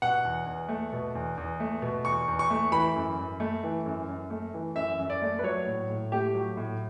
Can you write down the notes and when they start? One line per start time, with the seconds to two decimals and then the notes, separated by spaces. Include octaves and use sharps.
0.02 B2 F#5
0.25 E2
0.46 E2
0.69 A3
0.92 B2
1.15 E2
1.37 E2
1.60 A3
1.82 B2
2.05 E2 C#6
2.28 E2
2.39 C#6
2.50 A3
2.72 E3 B5
2.96 F#2
3.18 F#2
3.40 A3
3.63 E3
3.86 F#2
4.09 F#2
4.30 A3
4.54 E3
4.76 F#2 E5
4.99 F#2
5.10 D5
5.22 A3
5.39 B4
5.44 F#3 C#5
5.67 A2
5.89 A2
6.12 A3 G4
6.34 F#3
6.57 A2